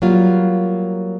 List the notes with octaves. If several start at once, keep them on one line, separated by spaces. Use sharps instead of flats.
F#3 G3 A#3 F4